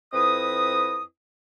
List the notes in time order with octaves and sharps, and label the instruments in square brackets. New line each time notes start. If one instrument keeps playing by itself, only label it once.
[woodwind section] F2 C4 E4 B4 D#5 D#6